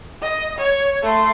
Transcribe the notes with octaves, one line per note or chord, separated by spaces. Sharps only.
D#5
C#5
A3 C6